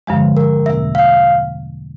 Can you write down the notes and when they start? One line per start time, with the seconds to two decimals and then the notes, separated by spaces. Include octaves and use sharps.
0.07 G2 D3 F3 G#3
0.37 A#4
0.66 E2 B2 G3 A#3 C#4 E5
0.95 F5